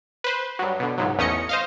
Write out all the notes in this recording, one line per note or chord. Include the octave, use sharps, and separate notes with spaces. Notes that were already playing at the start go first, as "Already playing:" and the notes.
B4 C5
G2 F#3
B2 D3
C#2 G#2 F#3
A1 E2 A3 C#4 D#5 C#7
C5 D#5 F5